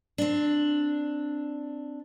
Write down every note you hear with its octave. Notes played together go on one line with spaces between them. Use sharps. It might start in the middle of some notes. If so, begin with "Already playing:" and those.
C4 D4